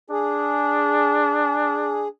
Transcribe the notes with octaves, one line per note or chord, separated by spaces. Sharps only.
D4 G#4